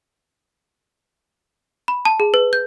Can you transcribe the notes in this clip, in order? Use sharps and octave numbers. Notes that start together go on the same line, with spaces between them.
B5
A5
G#4
B4
G6